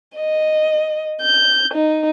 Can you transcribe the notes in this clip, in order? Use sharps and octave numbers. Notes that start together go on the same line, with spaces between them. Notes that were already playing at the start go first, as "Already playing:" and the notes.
D#5
G6
D#4